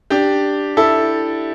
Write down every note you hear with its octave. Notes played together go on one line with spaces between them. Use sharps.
D4 G4
E4 A4